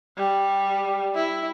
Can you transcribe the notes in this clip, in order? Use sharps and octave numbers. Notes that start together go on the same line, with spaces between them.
G3
E4